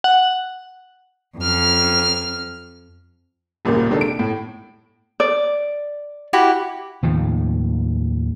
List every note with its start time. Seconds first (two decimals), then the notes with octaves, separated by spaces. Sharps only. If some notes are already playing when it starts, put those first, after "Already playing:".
0.04 F#5
1.38 F2 F6
3.65 D#1 G#1 A#2 C#3 A#3
3.89 C3 D#3 G#3 D4 A4
4.01 D7
4.19 A2
5.20 D5
6.33 E4 F#4 G4
7.03 D#2 A2 F3